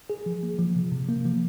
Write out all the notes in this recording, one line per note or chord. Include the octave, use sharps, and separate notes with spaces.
G#4
F3
A#3
F3
C3
C3
A#3
F3